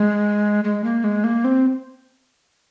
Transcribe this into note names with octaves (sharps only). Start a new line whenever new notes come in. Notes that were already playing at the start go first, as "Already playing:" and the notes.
Already playing: G#3
G#3
A#3
G#3
A#3
C4